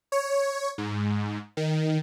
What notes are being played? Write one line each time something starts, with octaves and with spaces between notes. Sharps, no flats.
C#5
G#2
D#3